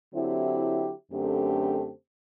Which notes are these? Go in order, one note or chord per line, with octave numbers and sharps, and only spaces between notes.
D3 F#3 C4 E4 G4
F#2 D3 A3 C4 G4